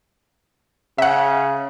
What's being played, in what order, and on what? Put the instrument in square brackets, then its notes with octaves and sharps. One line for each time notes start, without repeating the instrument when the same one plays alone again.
[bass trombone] C#3 [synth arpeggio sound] E5 F#5